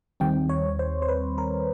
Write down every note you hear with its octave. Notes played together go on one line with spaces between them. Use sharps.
D#2 D#3 G3 C4 G5
C#5
C5
C5
B4
A#4